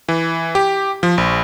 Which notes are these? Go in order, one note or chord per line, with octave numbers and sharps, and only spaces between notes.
E3
G4
F3
A#1